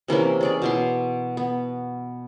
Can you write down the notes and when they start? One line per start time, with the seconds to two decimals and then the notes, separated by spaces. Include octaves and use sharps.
0.08 C3 E3 A#3 C#4
0.41 C#4 G#4 D5
0.62 B2 E3 C6
1.37 B3